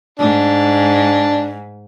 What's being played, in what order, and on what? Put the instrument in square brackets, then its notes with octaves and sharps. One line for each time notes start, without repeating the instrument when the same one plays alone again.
[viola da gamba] G#2 [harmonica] D4